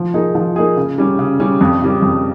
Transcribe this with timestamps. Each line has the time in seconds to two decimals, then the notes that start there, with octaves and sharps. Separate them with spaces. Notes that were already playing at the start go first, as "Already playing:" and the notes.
Already playing: F3
0.14 A#3 D#4 G#4
0.35 F3
0.56 A#3 D#4 G#4
0.77 C#3
0.98 G3 C#4
1.19 C#3
1.40 G3 C#4
1.61 F2
1.82 C#3 G3 C#4
2.02 F2